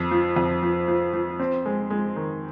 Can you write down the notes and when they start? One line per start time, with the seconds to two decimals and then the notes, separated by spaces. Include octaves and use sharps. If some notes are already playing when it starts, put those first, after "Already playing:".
Already playing: F2
0.11 F3
0.36 F2
0.63 F3
0.88 F3
1.14 F3
1.39 C4
1.66 G#3
1.90 G#3
2.16 D#3